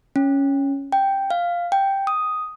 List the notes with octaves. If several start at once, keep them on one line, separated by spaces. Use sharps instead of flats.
C#4
G5
F5
G5
D#6